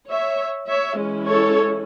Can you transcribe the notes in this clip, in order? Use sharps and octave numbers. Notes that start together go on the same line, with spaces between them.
C#5 E5
C#5 E5
E3 G#3 C#4 E4
A4 C#5